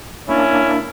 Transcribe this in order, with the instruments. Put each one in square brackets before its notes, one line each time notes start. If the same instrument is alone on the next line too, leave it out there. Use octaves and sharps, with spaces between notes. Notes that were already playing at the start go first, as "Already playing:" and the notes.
[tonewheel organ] A#3 D4 [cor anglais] C#4 [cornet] E4